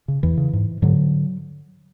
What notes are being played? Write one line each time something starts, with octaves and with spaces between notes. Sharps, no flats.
C#3
E2 E3
C#3
G#2
G#2 D3 F#3